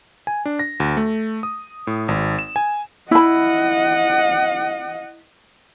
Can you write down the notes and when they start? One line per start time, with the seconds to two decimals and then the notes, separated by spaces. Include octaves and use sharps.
0.27 G#5
0.45 D4
0.59 A#6
0.80 D2
0.97 A3
1.43 D#6
1.87 A2
2.08 G#1
2.39 E7
2.56 G#5
3.11 E4 D#5 F#5 B5